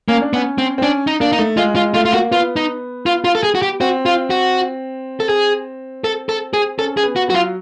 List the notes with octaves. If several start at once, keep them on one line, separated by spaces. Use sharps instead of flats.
A#3 C#4
D4
B3 C#4
C4
C4
C#4 D4
D#4
A#3 D4
D#4
A3
G#3 F4
G#3 F4
A3 F4
F4
A#3 F#4
B3 F4
D#4
F4
F4
A4
G#4
F#4
G4
C4 F#4
F4
F#4
A4
G#4
A4
A4
G#4
C#4 A4
G#4
B3
F#4
F#3 F#4
F4